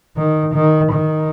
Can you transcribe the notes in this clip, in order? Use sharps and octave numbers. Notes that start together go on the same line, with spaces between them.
D#3
D#3
D#3